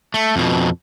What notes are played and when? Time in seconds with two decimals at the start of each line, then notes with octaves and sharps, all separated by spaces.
0.14 A3
0.36 F2 B2